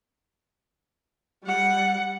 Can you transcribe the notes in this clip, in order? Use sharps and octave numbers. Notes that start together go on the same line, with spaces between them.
G3 F#5